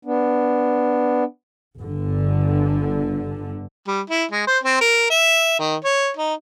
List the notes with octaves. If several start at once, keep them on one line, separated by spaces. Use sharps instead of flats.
B3 D4
G1 D3
G3
E4
G#3
C5
C4
A#4
E5
D#3
C#5
D#4